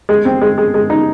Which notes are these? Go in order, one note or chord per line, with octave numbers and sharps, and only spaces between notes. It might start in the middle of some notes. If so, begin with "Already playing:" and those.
G#3
C4
G#3
G#3
G#3
D#4